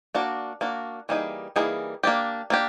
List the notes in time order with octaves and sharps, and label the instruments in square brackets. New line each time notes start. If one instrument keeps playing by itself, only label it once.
[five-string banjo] A#3 D4 F#4
A#3 D4 F#4
E3 G3 A#3 D#4 G#4
E3 G3 A#3 D#4 G#4
A#3 D4 G4
A#3 D4 G4